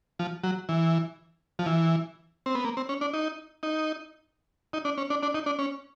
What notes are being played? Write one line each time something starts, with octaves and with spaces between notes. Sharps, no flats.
F3
F#3
E3
F3
E3
C4
B3
A#3
C4
C#4
D4
D#4
D#4
D#4
D4
C#4
D4
D4
D#4
D4
C#4